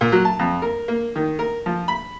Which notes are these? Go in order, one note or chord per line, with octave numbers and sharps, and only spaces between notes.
A#2
F#3
A5
F2
A#4
A#3
D#3
A#4
F3
B5